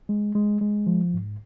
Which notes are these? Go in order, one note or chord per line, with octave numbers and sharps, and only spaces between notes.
G#3
G#3
G#3
F3
G#2